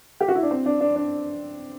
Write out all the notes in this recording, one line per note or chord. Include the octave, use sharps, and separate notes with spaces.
G4
F#4
E4
D4
C4
D4
D4
D4